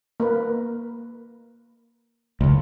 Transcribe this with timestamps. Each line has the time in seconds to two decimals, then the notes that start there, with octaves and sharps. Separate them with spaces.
0.20 A#3 A#4 B4
2.41 F#1 C#2